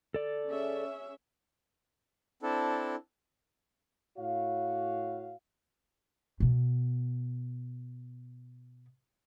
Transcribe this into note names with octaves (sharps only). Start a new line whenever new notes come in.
A4 D5
C#4 G#4 E5
C4 D4 E4 A4
A2 F#4 C#5 F5
B2 B3